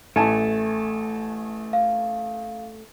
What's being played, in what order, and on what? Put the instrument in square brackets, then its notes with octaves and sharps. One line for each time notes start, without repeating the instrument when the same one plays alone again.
[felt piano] A1 G#5 A5 [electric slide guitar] A3
[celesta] F5